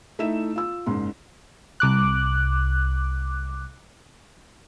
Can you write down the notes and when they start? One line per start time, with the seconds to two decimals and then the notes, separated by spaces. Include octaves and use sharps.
0.19 A3 D#4 E4 E5 E7
0.56 F4 E6
0.86 F#1 G#2 C6
1.80 C2 D6 F#6